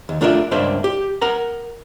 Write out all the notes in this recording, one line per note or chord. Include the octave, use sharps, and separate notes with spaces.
D#2
A3 D4 F4 A#4 D5 E5
C#2 G2 A#3 D4 C5 E5
G4
A#4 F#5 A#5